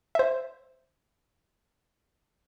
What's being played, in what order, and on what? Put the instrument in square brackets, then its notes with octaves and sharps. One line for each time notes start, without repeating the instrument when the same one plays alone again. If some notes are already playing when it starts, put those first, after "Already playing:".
[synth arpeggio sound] C5 E5